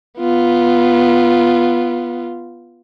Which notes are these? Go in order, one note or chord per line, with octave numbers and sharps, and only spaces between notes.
B3 F4